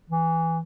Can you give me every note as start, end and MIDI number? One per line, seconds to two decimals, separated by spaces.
0.10 0.61 52